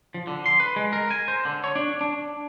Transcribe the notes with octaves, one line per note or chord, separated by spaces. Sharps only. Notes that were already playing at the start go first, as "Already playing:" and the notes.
F3
D3
C6
B4
G#3
A#4
G#5
C5
D3
C#5
D4
D4